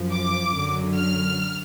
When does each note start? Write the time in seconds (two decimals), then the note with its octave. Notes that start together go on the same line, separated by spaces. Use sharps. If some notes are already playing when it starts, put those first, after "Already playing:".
Already playing: F#2 F3
0.12 D6
0.54 F#2 D3 F#3
0.96 F6